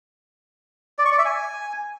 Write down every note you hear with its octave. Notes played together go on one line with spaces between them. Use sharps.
D5
C#6
D5
E5
G#5